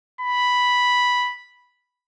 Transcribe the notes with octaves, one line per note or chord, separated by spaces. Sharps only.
B5